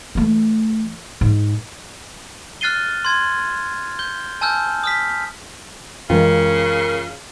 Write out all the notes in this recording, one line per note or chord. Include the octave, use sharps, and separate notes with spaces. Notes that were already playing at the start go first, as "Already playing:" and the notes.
E3 A3
G#2
F6 F#6 A6 C7 D#7 G7
C6 G#6
G6 G7
G#5 A5 E6 F6 G6
D#6 F6 B6
F#2 C#3 E3 G#3 F4 A#4 G5